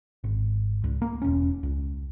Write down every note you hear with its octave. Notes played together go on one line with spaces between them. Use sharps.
G#1
C#2
A#3
E1 C#4
C#2